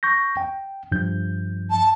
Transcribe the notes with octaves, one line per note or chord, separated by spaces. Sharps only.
C#6 G6 A#6
G5
G2 F3 G6
A5